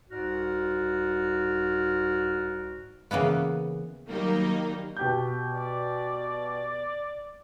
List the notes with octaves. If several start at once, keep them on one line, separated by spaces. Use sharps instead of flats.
C2 G#2 F#4 D5 F6
C#3 E3 A#3 B3
D#3 F#3 G3 A#3 D#4
B2 G4 G6
D5